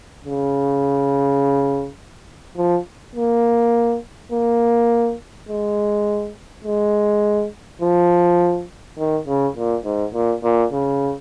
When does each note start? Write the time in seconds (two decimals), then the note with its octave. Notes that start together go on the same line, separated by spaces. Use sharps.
0.24 C#3
2.57 F3
3.15 A#3
4.32 A#3
5.49 G#3
6.65 G#3
7.81 F3
8.98 D#3
9.27 C#3
9.56 A#2
9.85 G#2
10.14 A#2
10.44 A#2
10.72 C#3